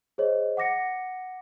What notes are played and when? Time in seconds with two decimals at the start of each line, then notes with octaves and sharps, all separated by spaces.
0.18 G#4 C5 C#5 D#5
0.57 F#5 D6 A#6 C#7